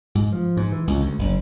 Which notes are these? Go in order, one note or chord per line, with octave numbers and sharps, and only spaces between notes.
G#2
F3
G#2
E3
C#2
D2
F#1